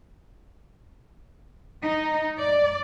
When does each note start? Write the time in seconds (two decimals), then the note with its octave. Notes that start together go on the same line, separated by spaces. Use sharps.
1.83 D#4
2.39 D5